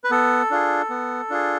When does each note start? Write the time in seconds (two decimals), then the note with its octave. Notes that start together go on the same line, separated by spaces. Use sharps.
0.04 B4
0.11 B3 A4
0.51 D4 F4 G#4
0.90 B3
1.30 D4 F4 G#4